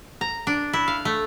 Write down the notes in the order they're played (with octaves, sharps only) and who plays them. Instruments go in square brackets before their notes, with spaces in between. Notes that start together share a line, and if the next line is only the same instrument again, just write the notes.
[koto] A#5
D4
E4
F5
A3